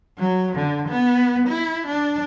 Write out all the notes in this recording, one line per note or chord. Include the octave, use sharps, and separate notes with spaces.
F#3
D3
B3
E4
D4